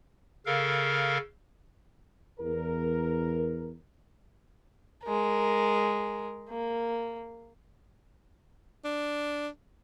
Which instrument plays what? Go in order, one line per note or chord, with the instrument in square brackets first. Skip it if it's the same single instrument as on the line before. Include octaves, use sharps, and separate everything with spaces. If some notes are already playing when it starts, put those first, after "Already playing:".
[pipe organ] C#3 A4 A#4 F5
[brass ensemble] E2 A#4
[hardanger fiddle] G#3 A#4
A#3
[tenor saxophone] D4